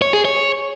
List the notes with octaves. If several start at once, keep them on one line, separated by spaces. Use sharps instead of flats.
C#5
G#4
C#5